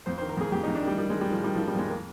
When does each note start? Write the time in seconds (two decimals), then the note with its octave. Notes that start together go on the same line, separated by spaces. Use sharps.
0.06 F2 C5
0.18 C5
0.21 D#3
0.29 A#4
0.37 F2 G#4
0.52 F2 G4
0.63 D#4
0.68 F2
0.75 D4
0.83 D#3 G3
0.98 D#3 G3
1.10 G#3
1.13 D#3
1.21 G3
1.29 D#3 F3
1.44 D#3 G3
1.56 F3
1.59 D#3
1.67 G3
1.75 F2 G#3
1.90 A#3